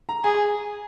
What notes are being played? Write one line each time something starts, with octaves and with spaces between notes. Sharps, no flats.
A#5
G#4 G#5